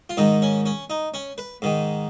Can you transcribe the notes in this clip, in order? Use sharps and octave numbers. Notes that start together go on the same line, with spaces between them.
F4
G#2 D#3 D#4
C#4
C#4
D#4
C#4
B4
G#2 D#3